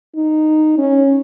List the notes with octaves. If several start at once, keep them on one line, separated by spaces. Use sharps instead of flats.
D#4
C#4